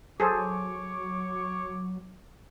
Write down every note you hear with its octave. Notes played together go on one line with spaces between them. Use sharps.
F#3 G#4 A4 C5 C#5 C#6 D6